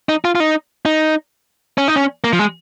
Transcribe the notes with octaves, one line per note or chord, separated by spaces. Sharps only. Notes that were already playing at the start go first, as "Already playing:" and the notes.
D#4
F4
F4
D#4
D#4
C#4
D#4
C#4
A#3
F3
G#3